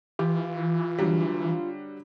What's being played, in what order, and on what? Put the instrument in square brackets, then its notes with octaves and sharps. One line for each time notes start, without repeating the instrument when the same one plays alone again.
[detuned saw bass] E3 [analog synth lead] F4 [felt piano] G4
[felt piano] D3 F#3 G3